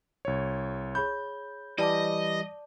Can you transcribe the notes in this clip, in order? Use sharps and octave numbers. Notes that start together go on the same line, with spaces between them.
C2 C#5
G#4 C#5 B5 G6
E3 G3 D5 D#5 A5 D6